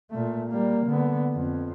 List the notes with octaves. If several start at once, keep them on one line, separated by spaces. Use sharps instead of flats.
A#2 A3
G3 A#3
D3 B3
F2